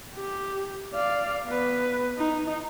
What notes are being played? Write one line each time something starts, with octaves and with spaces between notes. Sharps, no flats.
G4
D5 F5
B3 B4
D#4